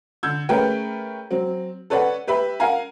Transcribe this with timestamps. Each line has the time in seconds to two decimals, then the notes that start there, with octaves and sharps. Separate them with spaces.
0.23 D3 E6 G6 G#6
0.49 A3 C#4 G#4 A#4 B4 G5
1.31 F#3 C4
1.90 A4 B4 C#5 D5 F#5
2.27 G4 B4 E5 B5
2.60 A#4 F5 F#5 G#5 A#5